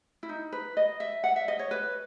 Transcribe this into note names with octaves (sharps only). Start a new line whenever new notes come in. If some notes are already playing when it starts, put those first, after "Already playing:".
E4
D#4
B4
D#5
E5
F#5
E5
D#5
C#5
B4